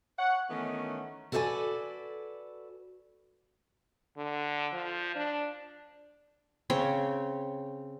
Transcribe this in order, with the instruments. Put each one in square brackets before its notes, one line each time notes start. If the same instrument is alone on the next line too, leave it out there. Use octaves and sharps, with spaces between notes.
[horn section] C#5 F#5
D#3 E3 A3 B3 C#4 D#4
[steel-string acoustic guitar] F#4 A4 B4 C5 D5 G#5
[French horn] D3
F3
D4
[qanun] C#3 C4 C#5 G5